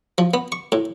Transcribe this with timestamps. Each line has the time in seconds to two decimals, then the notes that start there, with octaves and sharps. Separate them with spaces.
0.18 F3
0.34 B3
0.52 C#6
0.72 A2